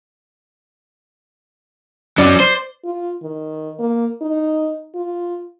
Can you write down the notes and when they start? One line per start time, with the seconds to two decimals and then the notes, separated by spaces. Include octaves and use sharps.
2.18 F#3 C#4 D5
2.40 C5
2.85 F4
3.23 D#3
3.79 A#3
4.22 D#4
4.95 F4